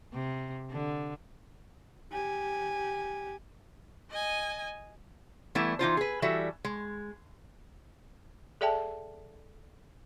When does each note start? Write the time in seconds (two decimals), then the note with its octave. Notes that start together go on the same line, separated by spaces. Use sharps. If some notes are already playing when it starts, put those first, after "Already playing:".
0.13 C3
0.71 D3
2.12 G4 G#5
4.11 D#5 G#5
5.55 E3 G3 A3 B3 E4
5.79 E3 D#4 F4 C5
5.97 G#4 B4
6.22 E3 G3 F#4 A4 E5
6.65 G#3
8.61 G#4 A4 D5 E5 G5 A5